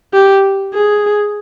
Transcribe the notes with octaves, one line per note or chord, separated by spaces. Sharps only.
G4
G#4